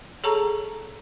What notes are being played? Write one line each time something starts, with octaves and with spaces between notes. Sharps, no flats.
G#4 A4 C#5 A5 A#5 C#6